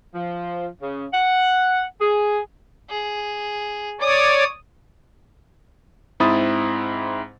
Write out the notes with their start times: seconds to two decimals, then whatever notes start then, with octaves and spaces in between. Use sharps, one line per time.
0.15 F3
0.82 C#3
1.13 F#5
2.01 G#4
2.90 G#4
4.01 C#5 D5 D#6
6.20 G#2 C4 E4 B5 D#6 A6